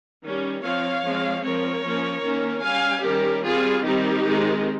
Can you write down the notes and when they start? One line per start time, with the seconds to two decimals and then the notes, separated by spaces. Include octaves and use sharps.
0.22 D#3 G3 C#4
0.62 F3 C4 C#5 F5
1.03 F3 G#3 C4
1.43 F3 C4 A#4 C#5
1.83 F3 A#3 C#4
2.23 D#3 A#3 C#4
2.63 G3 C#4 F5 G#5
3.04 D#3 G3 C#4 G4 A#4
3.44 G3 C4 F4 G#4
3.84 D#3 G3 C4 D#4 G4
4.24 D#3 G#3 C4